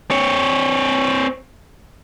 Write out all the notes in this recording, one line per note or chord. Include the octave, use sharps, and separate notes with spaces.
C4 C#5